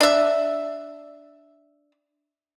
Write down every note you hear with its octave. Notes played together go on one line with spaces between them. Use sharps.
D4 E5